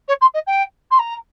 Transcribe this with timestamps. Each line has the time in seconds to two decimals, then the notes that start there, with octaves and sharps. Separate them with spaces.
0.08 C#5
0.21 C6
0.34 D#5
0.47 G5
0.91 C6
0.99 A#5